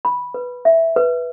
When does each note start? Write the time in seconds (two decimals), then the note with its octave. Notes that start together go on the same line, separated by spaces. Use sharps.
0.05 B5
0.34 B4
0.65 E5
0.96 B4